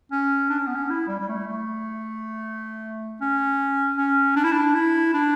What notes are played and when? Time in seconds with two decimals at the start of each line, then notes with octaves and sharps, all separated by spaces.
0.12 C#4
0.50 D4
0.59 C#4
0.67 B3
0.75 C#4
0.90 E4
1.08 G3
1.19 G3
1.28 A3
1.47 A3
3.21 C#4
3.97 C#4
4.36 D4
4.44 E4
4.52 D4
4.74 E4
5.14 D4